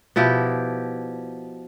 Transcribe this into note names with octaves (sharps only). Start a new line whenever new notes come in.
B2 F3 E4 G4